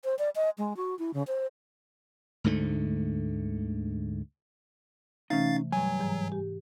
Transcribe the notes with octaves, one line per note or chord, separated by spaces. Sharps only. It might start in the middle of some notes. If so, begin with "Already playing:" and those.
C5
D5
D#5
G#3
F#4
E4
C#3
C5
D2 G#2 D3 A3
C3 E3 A3 C#4 D#4 F5 A6
G2 F#3 G#5
G#2 E3 A#5
G4